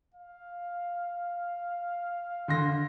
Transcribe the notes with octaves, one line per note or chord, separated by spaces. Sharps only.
F5
D3 C6 A#6